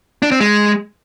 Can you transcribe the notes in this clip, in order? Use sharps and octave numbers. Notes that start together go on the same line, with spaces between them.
D4
C4
G#3